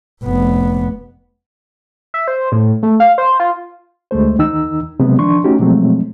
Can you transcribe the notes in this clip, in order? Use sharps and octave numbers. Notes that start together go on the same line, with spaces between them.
F1 B3
E5
C5
A2
A3
F5
C5
F4
D2 G#3 A3 C5
D#2 D#3 D#4 E6
C3 F#3 G#3 B3
D#3 F3 D4 C6 C#6
A3 C#4 D#4 F#4 G4
B2 F3 F#3 G#3 A3 C4